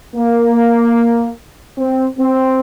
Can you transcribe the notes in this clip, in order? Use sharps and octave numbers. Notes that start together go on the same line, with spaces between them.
A#3
C4
C4